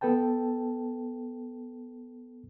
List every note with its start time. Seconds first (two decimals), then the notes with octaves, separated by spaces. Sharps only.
0.01 B3 A4 B4 G5 A5